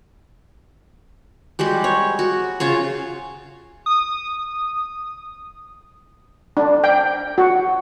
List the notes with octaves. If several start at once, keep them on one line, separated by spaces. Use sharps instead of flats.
G3 G#3 F#4 G4
C#5
F#4
C#3 F4 C#5
D#6
D4
G5
F#4